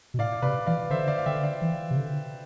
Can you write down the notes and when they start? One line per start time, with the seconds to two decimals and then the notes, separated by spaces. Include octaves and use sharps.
0.14 B2
0.18 A2 D5 F5
0.42 C3 B4 D5
0.67 E3 D5 F5
0.90 D3 C5 E5
1.08 D5 F5
1.18 F5
1.26 D3 E5 G5
1.43 D5 F5
1.62 E3
1.91 C3
1.97 D3